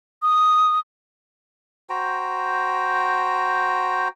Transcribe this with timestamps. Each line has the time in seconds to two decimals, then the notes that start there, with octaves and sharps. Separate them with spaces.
0.22 D#6
1.90 F#4 C5 G5 A#5